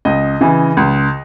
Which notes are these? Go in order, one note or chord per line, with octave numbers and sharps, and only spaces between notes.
C#2 D#5
C#3 E3
C#2